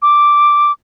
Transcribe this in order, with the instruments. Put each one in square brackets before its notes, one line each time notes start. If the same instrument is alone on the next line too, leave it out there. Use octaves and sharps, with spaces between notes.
[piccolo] D6